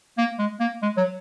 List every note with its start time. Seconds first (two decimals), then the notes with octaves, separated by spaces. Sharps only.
0.18 A#3
0.39 G#3
0.60 A#3
0.82 G#3
0.97 F#3